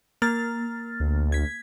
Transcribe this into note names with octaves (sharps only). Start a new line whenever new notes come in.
A#3 F6 A6
D2
G#6 B6